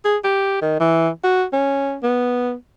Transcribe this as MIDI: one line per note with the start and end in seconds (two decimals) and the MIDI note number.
0.05 0.17 68
0.24 0.62 67
0.62 0.76 51
0.80 1.09 52
1.24 1.45 66
1.53 1.97 61
2.03 2.53 59